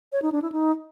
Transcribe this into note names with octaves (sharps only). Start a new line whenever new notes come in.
C#5
D#4
D4
E4
D#4